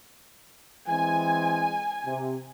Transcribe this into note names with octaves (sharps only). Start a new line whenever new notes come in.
E3 G#3 C4 G#5
C3